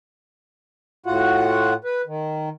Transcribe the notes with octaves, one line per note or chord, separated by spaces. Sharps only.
A2 F4 F#4 F#5
B4
D#3